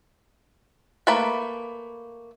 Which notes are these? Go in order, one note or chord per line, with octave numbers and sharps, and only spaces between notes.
A3 A#3 B4 A5 B5